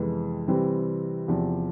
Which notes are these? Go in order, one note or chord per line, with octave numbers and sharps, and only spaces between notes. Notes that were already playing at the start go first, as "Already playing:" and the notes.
Already playing: F2 C3 E3 G#3 B3
C3 E3 G3 C4
E2 C3 F3